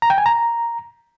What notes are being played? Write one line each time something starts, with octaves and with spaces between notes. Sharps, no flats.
A#5
G5
G#5
A#5